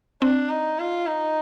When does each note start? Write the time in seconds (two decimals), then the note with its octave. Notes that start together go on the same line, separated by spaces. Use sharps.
0.22 C4 D4
0.50 D#4
0.79 F4
1.07 D#4